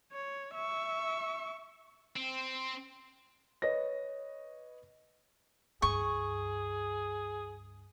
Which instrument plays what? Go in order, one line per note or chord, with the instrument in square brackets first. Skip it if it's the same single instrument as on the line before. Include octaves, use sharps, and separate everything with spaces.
[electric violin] C#5
E5 C#6
[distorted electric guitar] C4
[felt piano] B4 C#5 D#5 A#6
[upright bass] C#2 G2 [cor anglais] G#4 [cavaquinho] C#6